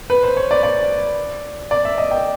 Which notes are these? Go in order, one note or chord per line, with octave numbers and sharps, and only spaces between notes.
B4
C5
C#5
D5
D5
D5
E5
D#5
G5